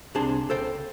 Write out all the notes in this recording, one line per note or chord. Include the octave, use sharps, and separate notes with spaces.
C2 C3 D4 G#4 A5 C6
C#2 A4 C5 G5